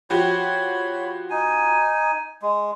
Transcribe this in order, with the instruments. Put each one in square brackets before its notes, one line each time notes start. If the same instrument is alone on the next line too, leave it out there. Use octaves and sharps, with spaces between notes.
[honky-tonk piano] F3 F#4 G4 [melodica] C#5 B5
[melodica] D#4 G#5
G#3